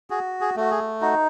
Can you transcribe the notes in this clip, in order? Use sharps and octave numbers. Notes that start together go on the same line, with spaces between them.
F#4 G#4
G#4
A3 F#4
G#4
D#4 F#4